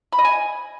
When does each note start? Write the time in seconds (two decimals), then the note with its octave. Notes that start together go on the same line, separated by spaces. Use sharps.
0.12 B5
0.19 D#5
0.25 G#5